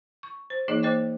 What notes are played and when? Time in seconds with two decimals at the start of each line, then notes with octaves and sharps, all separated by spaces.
0.23 C#6
0.50 C5
0.68 E3 A#3 D#4 G#4 D#5
0.83 A#3 C5 D#5 G5 D6